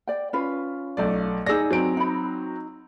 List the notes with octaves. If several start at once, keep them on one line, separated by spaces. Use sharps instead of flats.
D5 G5
C#4 F4 B4
B1 A3 D5
D#4 G#4 D5 E6 A#6
F#3 C4 D7
D#4 B5